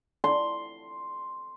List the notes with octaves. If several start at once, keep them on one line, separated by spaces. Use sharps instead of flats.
C6